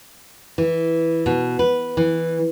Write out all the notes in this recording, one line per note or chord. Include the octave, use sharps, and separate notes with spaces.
E3
B2
B4
E3